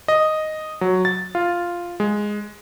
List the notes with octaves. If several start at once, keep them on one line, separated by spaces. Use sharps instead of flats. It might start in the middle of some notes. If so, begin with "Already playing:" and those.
D#5
F#3
A6
F4
G#3